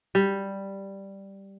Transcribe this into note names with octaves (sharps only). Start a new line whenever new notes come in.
G3